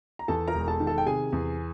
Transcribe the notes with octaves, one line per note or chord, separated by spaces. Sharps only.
A#5
E2 A4 A5
A#4 A#5
E1
A4 A5
D#3
A4 A5
G5
C3 G#4 G#5
E2